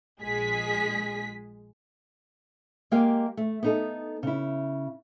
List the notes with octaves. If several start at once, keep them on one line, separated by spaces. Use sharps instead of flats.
A#1 G#3 G#4 B6
G#3 A#3 G4 A#4 F5 G5
A3
B3 D#4 A4
C#3 E4